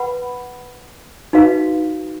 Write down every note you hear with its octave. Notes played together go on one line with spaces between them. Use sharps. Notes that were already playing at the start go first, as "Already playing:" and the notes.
Already playing: B4 F#5 B5
D#4 F#4 B4 F5